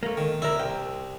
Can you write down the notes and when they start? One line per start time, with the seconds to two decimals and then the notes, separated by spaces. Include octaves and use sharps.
0.03 A3 A#3
0.17 D#3
0.42 D2 E4 A#4
0.60 C2 G5